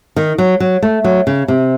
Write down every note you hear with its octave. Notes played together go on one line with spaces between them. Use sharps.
D#3
F#3
F#3
A3
F#3
C#3
C3